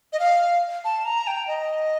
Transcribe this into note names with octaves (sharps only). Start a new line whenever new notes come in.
D#5
F5
A5
A#5
G5
D#5